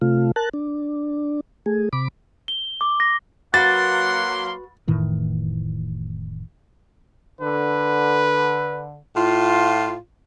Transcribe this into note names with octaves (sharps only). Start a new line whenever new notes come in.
C3 A3 F4
A#4 A5 F#6
D4
A3 G#4
C3 B5 D6
G7
D6
A#6
F#3 A#3 F#4 B4 F#5 C6 A6
F1 A2 D#3 E3
D3 B4
A2 F4